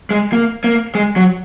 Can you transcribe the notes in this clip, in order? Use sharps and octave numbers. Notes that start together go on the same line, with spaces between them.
G#3
A#3
A#3
G#3
F#3